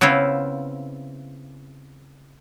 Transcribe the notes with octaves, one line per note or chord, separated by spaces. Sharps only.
C#3 B3 C4 E4 F4